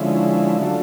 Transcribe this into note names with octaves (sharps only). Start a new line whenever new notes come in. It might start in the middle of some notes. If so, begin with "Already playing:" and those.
Already playing: D3 F3 G#3 C#4 E4
F#3 A3 D4 F4